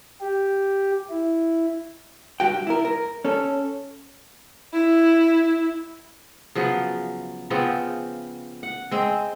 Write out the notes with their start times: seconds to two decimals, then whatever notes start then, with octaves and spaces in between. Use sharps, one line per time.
0.21 G4
1.10 E4
2.40 G2 F3 F#4 G5
2.67 E4 A#4
2.85 A#4
3.25 C#4 A4
4.73 E4
6.55 C#3 F3 F#3 B3
7.50 C#3 F3 B3 C4
8.63 F#5
8.91 G#3 C4